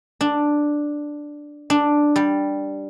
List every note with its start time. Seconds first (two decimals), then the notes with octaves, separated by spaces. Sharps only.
0.21 D4
1.70 D4
2.16 G3